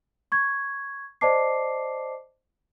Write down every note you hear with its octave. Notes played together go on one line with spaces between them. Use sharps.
C#6 G#6
C5 D5 D#5 A5 D6 C7